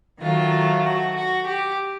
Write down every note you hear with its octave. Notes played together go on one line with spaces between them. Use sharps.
D#3 F#3 A3 F4
F#4
F#4
G4